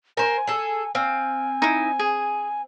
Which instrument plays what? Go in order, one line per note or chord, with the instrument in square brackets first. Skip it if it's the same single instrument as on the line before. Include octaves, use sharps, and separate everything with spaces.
[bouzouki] A#4 C5 [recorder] G#5
[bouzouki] G#4 A4
[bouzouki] C4 [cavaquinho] F5 [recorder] G#5
[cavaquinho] D#4 E4
G#4